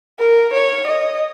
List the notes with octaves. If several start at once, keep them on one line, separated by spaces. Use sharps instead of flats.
A#4
C#5
D#5